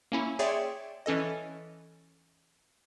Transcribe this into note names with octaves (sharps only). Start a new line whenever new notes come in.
A#3 C#4 E4
G#4 C#5 D5 E5 G5 C6
E3 C#4 A4 D#5